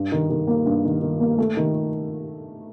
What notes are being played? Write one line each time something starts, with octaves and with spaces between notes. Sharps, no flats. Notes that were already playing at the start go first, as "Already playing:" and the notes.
Already playing: G2
D#3
D#3
A#3
G2
D#3
D#3
A#3
A3
D#3